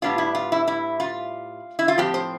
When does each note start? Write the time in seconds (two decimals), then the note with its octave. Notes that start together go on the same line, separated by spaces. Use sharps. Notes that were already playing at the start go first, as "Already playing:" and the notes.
0.02 A2 G3 B3 D4 F4
0.18 E4
0.35 F4
0.52 E4
0.68 E4
1.00 F4
1.79 E4
1.88 F4
1.98 A2 F3 C4 G4
2.14 C5